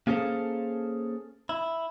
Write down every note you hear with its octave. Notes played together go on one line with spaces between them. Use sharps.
A#3 C#4 G#4 A4 C5 F5
E4